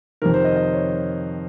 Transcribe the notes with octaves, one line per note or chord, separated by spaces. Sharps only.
F2 C3 D#3 A#4
C5
D#5
D#5
C#5